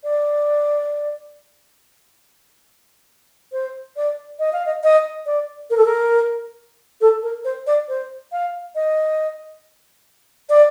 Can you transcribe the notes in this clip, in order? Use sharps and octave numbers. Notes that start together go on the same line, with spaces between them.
D5
C5
D5
D#5
F5
D#5
D#5
D5
A#4
A4
A#4
A4
A#4
C5
D5
C5
F5
D#5
D5